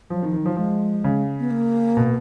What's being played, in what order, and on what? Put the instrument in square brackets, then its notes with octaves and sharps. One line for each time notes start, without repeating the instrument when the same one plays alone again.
[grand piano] F3 [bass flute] F#3
[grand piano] D#3
[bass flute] F3
[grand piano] D#3
[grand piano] F3 [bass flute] F#3
[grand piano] F3 [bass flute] G#3
[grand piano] C#3
[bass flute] B3
A#3
[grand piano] B2